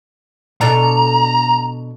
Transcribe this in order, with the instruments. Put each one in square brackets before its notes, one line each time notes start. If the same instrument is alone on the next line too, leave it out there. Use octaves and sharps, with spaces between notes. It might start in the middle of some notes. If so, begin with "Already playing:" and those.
[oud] B2 D4 A4 [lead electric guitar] A#5